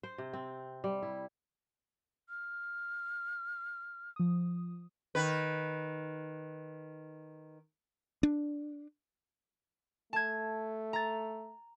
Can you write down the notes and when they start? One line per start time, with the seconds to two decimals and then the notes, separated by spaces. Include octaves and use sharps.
0.03 C5
0.18 C3
0.33 C4
0.84 G3
1.03 E4
2.29 F6
4.16 F3 D#6
5.15 D#3 B4
8.23 D4
10.13 A3 A5 G#6
10.93 A#5 A6